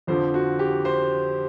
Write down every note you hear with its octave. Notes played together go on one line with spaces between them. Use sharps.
F2 D3 F3 C5
F#4
G4
C5